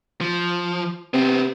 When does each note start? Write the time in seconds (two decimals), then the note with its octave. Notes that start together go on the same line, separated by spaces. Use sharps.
0.21 F3
1.14 C3 B3 C4